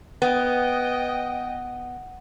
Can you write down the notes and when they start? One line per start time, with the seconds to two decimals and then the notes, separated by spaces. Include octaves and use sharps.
0.22 B3 D#5 G5